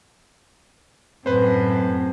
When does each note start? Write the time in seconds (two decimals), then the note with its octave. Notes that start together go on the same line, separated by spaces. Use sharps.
1.26 F#2 A2 C4 B4 C5